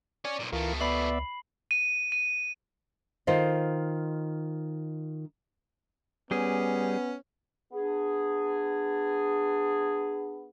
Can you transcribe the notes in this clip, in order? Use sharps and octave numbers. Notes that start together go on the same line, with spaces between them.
C#5 D5 G#5
B1 A#2
C#2 B2 E3 A3 F4 A#4
B3 D5 E5 B5 C7 F#7
D#7
D#7
D#3 F4 C5 D#5
G3 B3 C#4 G#4
B3 D4 G#4